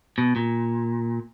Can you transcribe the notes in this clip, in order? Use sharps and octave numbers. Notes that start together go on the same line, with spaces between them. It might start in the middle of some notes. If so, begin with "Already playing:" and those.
B2
A#2